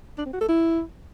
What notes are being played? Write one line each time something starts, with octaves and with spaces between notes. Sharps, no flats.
D4
C4
F#4
A4
E4